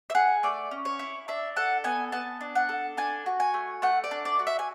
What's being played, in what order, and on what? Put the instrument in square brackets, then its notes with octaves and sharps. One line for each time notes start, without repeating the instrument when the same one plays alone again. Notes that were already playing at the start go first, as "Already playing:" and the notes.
[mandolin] E5
G#4 F#5
A3 D5
C#4
C#5
E4
D4 E5
A4 F#5
B3 G#5
B3 A5
D4
F#5
A4
D4 G#5
F#4
G#5
A3
A3 F#5
D5
D4
D5
F#4
E5
G#5